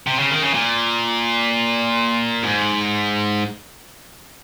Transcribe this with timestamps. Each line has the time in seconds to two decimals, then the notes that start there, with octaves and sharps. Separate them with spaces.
0.07 C3
0.19 C#3
0.31 D#3
0.42 C#3
0.54 A#2
2.43 G#2